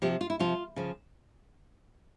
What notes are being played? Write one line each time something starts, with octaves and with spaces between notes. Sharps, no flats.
C3 F3 G4
F4
E4
C3 F3 F4
C#3 F3